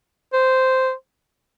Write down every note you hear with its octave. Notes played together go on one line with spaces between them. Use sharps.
C5